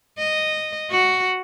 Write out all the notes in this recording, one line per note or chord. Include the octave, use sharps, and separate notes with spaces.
D#5
F#4